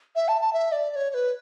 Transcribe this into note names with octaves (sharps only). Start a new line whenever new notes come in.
E5
A5
A5
E5
D5
D5
C#5
C#5
B4